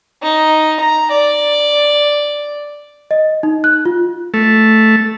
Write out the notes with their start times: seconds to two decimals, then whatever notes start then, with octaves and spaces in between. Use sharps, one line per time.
0.22 D#4
0.80 A#5
1.11 D5
3.11 D#5
3.43 D#4
3.64 F#6
3.85 F4
4.34 A3